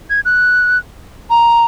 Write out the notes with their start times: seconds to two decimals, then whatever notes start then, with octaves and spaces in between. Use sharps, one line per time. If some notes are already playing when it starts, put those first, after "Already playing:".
0.10 G#6
0.25 F#6
1.30 A#5